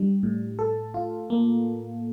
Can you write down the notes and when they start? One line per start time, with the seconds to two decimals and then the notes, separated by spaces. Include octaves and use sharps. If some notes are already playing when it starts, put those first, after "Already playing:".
Already playing: G3 D4
0.23 A2
0.59 A4
0.94 F4
1.30 A#3